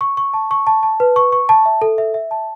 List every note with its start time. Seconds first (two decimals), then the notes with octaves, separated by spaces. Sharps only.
0.01 C#6
0.17 C#6
0.34 A5
0.51 C#6
0.67 A5
0.83 A5
1.00 B4
1.16 C#6
1.32 C#6
1.49 A5
1.66 E5
1.82 A4
1.98 E5
2.14 E5
2.31 A5